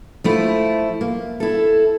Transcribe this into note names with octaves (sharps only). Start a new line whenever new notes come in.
F3 A3 E4
A#3
E4 A4